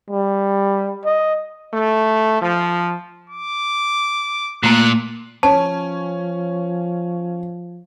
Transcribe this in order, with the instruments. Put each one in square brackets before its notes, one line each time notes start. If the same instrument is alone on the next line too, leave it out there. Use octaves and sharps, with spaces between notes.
[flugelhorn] G3
D#5
[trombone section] A3
F3
[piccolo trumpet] D6
[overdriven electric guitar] A#2 [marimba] A3 A#3 [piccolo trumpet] F#6
[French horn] F3 [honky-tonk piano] C#4 [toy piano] A5